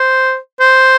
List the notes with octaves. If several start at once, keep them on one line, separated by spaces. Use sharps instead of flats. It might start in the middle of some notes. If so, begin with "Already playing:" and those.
Already playing: C5
C5